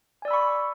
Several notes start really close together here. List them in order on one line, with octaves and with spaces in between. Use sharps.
G#5 D5 E6 B5 C#6